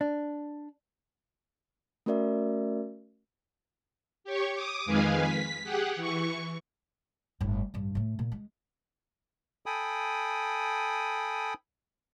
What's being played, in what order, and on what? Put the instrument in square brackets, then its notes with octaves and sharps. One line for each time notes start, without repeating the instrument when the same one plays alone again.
[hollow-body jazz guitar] D4
[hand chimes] A3 C#4 F#4 A#4 D5 E5
[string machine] G4 C#5 C#6
D6 D#6
F2 D#3 G#3 B4 F5 G#5
B6
G4 G#4 F#5
E3 C#6
[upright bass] G1 A2
A1 G2
A2 A3
A#2
G#3
[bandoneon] A4 G5 G#5 B5 D#6